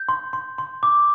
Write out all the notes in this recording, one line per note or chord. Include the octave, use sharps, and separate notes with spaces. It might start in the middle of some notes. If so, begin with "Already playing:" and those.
Already playing: G6
C6
C6
C6
D6